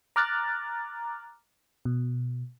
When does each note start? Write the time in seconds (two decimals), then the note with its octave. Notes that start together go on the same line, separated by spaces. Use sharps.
0.16 A#5 D6 F6 F#6 A6
1.85 B2